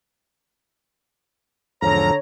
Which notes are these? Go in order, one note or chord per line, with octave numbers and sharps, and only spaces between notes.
E2 G#2 D3 F3 C#5 A#5